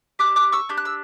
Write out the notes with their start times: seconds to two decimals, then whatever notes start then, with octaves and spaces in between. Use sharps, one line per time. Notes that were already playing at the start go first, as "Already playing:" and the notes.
0.19 D4 G4 D6 F#6
0.36 D6 F#6
0.52 C#6 E6
0.69 D4 G4 G6
0.77 F#6
0.85 E6